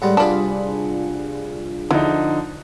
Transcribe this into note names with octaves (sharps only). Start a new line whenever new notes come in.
A2 G3 G#3 F#5
C2 D4 F4 G#4 D5 A5 B5
D3 F3 D#4 E4